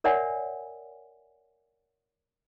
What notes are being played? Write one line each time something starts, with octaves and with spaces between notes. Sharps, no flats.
A#4 C#5 D5 E5 F#5 G#5